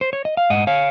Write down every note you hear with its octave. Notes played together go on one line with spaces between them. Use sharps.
C5
C#5
D#5
F5
G#2 D#5 F#5
C#5 F5